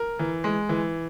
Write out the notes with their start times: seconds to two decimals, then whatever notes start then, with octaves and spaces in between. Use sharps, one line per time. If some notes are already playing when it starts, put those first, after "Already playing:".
Already playing: A#4
0.19 E3
0.44 G#3
0.69 E3